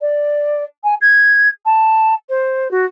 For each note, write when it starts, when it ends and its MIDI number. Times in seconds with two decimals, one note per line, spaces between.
0.01 0.64 74
0.84 0.95 80
1.01 1.49 92
1.66 2.15 81
2.29 2.71 72
2.71 2.86 66